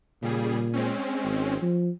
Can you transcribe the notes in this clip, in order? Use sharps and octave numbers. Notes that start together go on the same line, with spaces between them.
A#2 C#3 G3 G#4
G#3 C4 C#4
G#1
F3